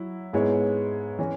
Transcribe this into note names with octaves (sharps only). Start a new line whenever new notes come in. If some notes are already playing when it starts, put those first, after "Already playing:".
Already playing: F#3 E4
G#2 G#3 B3 E4 C#5
E3 C#4